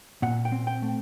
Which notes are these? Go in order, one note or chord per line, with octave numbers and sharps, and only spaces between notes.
A#2 F#5
G5
C4
G5
A3